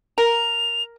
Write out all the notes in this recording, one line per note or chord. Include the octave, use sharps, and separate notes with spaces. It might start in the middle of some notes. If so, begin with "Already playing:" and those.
A#4 F7